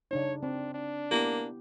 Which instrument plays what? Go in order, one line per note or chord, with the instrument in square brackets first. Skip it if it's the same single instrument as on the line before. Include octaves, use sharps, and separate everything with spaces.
[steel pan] C#3 D4 D#4 [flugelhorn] C#5
[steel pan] C4 [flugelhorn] D4
[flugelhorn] D4
[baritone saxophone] A#3 [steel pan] B3 E4 G4